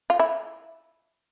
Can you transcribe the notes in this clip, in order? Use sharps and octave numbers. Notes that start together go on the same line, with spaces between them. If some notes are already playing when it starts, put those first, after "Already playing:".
F4
E4